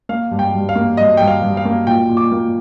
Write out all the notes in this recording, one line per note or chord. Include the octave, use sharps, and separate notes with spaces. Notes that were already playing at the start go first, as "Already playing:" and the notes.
A#3 F5
G2
G5
G2
F5
A#3
G2 D#5
G2 G5
F5
G2
F5
A#3
A#2 G5
A#2
D6
A#3